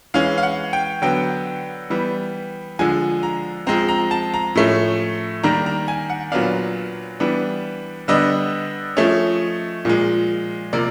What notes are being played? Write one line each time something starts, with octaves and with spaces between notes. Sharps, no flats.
E3 G#3 C#4 F5
F5
F#5
G5
D3 F#3 B3 G5
E3 G3 B3
D3 F3 G#3 G#5
A#5
F3 G#3 C4 A#5
A#5
A5
A#5
A2 F3 A3 C#4
D#3 G3 A#3 D4 A#5
A#5
G#5
F#5
A#2 F#3 B3 D4 F5
E3 G3 B3 D4
D3 G3 B3 D4 D#5
F3 A3 C#4
A#2 F3 G#3
C3 F3 A#3 D5